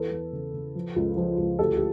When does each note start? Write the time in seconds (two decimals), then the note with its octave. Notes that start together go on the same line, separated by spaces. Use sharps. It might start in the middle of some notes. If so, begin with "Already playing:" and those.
Already playing: E2 A4 B4
0.11 E2
0.33 C#3
0.54 C#3
0.75 F3
0.96 C#2
1.17 F3
1.38 C#2
1.59 D2 G4 A4
1.76 G4